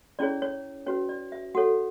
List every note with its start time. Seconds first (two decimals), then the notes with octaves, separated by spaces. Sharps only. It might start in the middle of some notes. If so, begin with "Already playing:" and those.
0.19 C#4 E4 G#4 C#5 D5
0.42 C#5
0.86 C#4 F#4 B4 C#5
1.09 D5
1.32 E5
1.55 F#4 A4 C#5 F#5